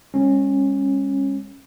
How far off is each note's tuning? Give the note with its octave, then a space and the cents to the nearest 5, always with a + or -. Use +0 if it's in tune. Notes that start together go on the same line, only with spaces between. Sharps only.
G#3 -45 C#4 -20